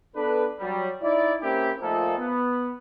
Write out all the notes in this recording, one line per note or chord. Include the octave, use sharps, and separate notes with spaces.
B3 D4 A4 B4
F#3 G3
D#4 E4 D5
A#3 C4 C#4 E4 G4
A#2 F3 A3 A#3 D#4 A4
B3